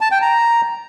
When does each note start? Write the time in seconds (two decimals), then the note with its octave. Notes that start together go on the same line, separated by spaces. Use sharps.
0.01 A5
0.11 G5
0.22 A#5